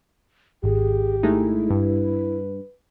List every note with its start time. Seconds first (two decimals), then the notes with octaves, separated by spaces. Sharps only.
0.64 G#1 G4 G#4
1.23 G#3 A3 D#4 E4
1.70 G2 B4